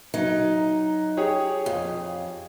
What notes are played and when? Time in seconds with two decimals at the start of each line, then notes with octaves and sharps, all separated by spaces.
0.14 F#3 D#4
1.17 G4 G#4 C#5
1.66 F2